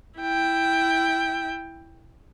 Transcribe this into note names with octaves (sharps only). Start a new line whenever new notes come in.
E4 G5